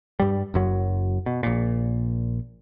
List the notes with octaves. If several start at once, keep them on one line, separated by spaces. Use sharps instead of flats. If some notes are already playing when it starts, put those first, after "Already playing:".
G2 G3
F#1 F#2 F#3
B2
A#1 A#2